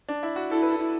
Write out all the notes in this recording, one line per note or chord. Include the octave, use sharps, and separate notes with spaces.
D4
E4
F#4
E4 A4
B4
A4
E4